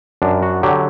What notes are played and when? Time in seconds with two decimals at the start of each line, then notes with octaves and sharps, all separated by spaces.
0.22 F#2 D4
0.42 F#4
0.63 D3 F#3 G4